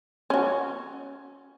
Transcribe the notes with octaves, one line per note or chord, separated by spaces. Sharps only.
C#4 F#4